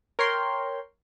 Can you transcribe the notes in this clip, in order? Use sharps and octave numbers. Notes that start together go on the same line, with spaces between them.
A#4 C#5 G5 C6